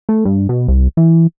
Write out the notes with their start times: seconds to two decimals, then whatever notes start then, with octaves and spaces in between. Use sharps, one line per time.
0.09 A3
0.25 G2
0.49 B2
0.68 C2
0.97 E3